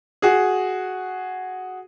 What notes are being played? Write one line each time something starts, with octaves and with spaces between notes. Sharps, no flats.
F#4 G#4